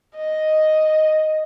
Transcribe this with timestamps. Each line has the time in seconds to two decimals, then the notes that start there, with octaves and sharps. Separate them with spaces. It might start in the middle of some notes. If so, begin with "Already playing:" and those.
0.16 D#5